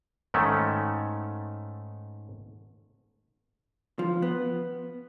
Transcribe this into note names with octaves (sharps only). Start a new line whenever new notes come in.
G#2 D#3 A3 C#4
F3
B3